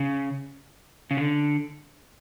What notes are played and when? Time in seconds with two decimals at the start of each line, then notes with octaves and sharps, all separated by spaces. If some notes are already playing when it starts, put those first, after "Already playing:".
Already playing: C#3
1.11 C#3
1.17 D3